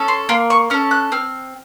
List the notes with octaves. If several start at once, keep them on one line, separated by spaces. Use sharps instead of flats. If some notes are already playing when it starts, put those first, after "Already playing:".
Already playing: C#4 A4
C6
A#3 C6
C#6
C#4 A4 F6
F#6
C4 F6